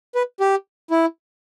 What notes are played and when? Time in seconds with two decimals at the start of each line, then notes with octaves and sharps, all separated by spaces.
0.15 B4
0.40 G4
0.90 E4